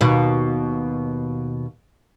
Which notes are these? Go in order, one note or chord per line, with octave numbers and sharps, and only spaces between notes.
D#2 B2